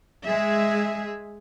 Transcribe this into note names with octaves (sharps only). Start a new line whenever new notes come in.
G#3 G#4 E5